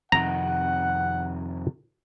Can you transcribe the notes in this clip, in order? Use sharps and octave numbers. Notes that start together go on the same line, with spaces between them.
F2 C3 D#3 F#5 A#5